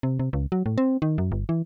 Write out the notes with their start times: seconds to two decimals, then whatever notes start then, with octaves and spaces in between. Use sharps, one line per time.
0.03 C3
0.19 C3
0.33 C#2
0.52 F#3
0.66 A2
0.78 C4
1.02 D#3
1.18 F#2
1.32 G1
1.49 E3